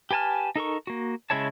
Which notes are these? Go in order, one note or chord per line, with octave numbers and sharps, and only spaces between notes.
G4 B4 G#5 A5 F6
D#4 A4 A#4 C#6
A#3 F#4
C#3 G#3 E4 C#5 A5